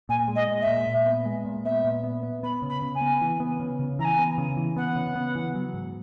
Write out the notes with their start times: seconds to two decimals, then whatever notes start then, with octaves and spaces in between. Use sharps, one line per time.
0.09 A#2 G#5
0.28 G#3
0.35 D#5
0.47 A#2
0.61 E5
0.67 A#2
0.87 A#2
1.06 B3
1.25 G#3
1.45 A#2
1.64 B3 E5
1.84 A#2
2.04 B3
2.23 B3
2.43 B3 B5
2.62 C#3
2.69 B5
2.82 C#3
2.94 G#5
3.01 B3
3.21 E3
3.40 B3
3.60 C#3
3.79 C#3
3.99 E3 G#5 A#5
4.19 B3
4.38 C#3
4.57 E3
4.76 B3 F#5
4.96 C#3
5.16 B3
5.35 E3
5.55 F#3
5.74 G#2